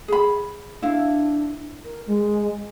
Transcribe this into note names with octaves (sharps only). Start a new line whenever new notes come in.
G#4 B5
D4 E4 F5
A#4
G#3